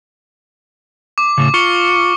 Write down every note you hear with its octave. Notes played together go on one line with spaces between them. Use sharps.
D6
A2 C#3
F4 C#6 C#7 G7